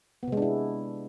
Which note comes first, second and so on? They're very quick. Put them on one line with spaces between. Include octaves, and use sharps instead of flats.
B3 C3 G#3 D4 E4